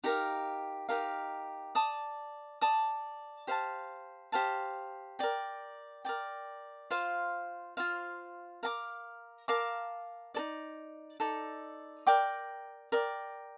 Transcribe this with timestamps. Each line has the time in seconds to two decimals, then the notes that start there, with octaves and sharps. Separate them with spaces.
0.04 D#4 G4 A#4 F5
0.89 D#4 G4 A#4 F5
1.75 D5 A5 D#6
2.61 D5 A5 D#6
3.47 G4 C5 F5 A5
4.32 G4 C5 F5 A5
5.19 A#4 D5 G5
6.05 A#4 D5 G5
6.91 F4 C5 F5
7.77 F4 C5 F5
8.63 A#4 F5 A5 D6
9.48 A#4 F5 A5 D6
10.34 D#4 A4 D5
11.20 D#4 A4 D5
12.07 A#4 D5 G5 D6
12.92 A#4 D5 G5 D6